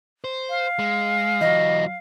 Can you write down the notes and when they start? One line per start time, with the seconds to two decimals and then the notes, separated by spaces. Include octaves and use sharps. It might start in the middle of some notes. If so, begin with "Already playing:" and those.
0.24 C5
0.50 F5
0.79 G#3
1.41 E3 F#3 D#5